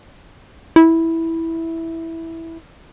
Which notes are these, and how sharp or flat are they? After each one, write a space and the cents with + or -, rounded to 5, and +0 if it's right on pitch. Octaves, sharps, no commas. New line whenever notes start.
E4 -5